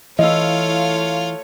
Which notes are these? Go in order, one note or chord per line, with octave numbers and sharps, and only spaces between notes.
E3 A3 E4 F4 C#5 D#5 F5